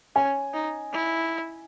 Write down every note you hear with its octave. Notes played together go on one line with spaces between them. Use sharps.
C#4 G#5
D#4
E4